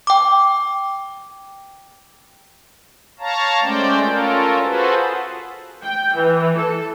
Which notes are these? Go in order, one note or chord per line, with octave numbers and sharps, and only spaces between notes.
G5 D6
C#5 F5 A5 A#5
G#3 A3 C#4 C5 D5 G5
C#4 F4 A4 A#4
F4 F#4 G#4 A4 B4 C5
G5
E3
A4